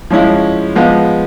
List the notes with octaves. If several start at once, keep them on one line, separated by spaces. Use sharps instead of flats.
F3 G#3 C#4 E4
F3 G#3 B3